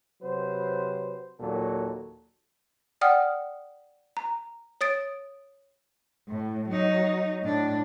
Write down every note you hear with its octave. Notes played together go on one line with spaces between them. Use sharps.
C3 F#3 B4 C5
D#2 A#2 F#3 A4
D5 F#5 G5 D#6 F6
A#5
C#5 D#6 A6 D7
A2
F#3 D#4
A2 D4